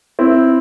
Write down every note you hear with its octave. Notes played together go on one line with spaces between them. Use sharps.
C4 E4